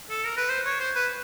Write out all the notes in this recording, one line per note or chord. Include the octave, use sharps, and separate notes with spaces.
A4
A#4
B4
C5
C#5
C5
B4